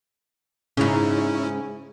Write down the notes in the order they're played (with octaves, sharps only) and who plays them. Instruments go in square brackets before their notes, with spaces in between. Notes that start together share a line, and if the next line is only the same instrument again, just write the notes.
[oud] G#2 C#3 [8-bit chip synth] C#4 E4